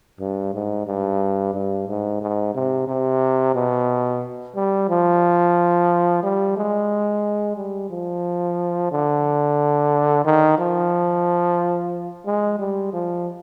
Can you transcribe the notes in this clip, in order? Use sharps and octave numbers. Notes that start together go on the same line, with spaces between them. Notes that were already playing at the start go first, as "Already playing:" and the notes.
G2
G#2
G2
G2
G#2
G#2
C3
C3
B2
G3
F3
G3
G#3
G3
F3
D3
D#3
F3
G#3
G3
F3